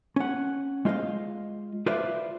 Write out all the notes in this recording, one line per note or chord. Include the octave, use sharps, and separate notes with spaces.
C#4 F#5
G#3 F4 C5 D#5 F5
F4 B4 C5 D5 E5 F5